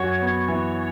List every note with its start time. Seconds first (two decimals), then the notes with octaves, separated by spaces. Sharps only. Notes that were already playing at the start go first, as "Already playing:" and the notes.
Already playing: F#2 F#4 C#5
0.21 B3
0.48 E3